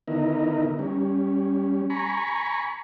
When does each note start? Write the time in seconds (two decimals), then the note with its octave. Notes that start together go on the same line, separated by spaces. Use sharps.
0.08 D3 D#3 B3 D#4 E4 A#4
0.79 G3 C#4
1.90 G#5 A#5 B5 C#6